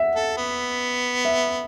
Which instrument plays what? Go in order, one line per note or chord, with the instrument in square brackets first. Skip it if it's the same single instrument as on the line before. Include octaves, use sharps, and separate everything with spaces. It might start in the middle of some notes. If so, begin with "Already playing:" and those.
Already playing: [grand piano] E5 F#5
[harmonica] A4
B3
[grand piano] E5